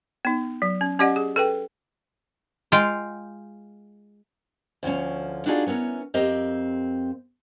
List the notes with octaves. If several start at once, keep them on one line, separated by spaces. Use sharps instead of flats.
B3 D#4
F#3
C#4
C#4 G4 D5 D#5 F#5
G#4
A4 B4 G5
G#3 F4 F5 G5
D2 F3 C#4
D4 D#4 F4 F#4 G#4 D5
B3 C#4 E4 A#4
F2 C4 G4 A#4 D#5